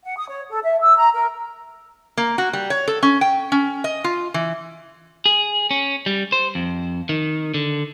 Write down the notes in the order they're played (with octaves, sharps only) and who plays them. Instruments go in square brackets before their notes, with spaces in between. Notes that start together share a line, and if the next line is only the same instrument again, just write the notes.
[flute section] F#5
D#6
C#5
A4
E5
E6
A#5
A#4
[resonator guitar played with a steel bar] A#3
F#4
G3
C#5
A4
C#4
G5
C#4
D#5
F4
E3
[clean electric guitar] G#4
C#4
G3
C5
F2
D#3
D3